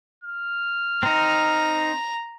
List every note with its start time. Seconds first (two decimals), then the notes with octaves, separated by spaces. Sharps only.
0.24 F6
1.03 C4 D#4 A#5